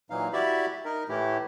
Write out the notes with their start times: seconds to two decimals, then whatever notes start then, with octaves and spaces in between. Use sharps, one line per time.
0.10 A#2 E3 F#3 D#4 F5
0.33 E4 F#4 G4 D5 E5 B5
0.85 D#4 A#4
1.09 A2 E3 A3 E4 G4